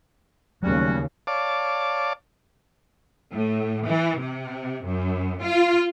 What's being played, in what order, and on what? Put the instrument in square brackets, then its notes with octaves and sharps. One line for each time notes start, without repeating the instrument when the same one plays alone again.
[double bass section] D#2 C#3 [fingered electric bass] F#3 A3 [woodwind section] G3 C#4 F#4
[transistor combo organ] C#5 D5 F5 A5 D6
[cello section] A2
E3
C3
F#2
F4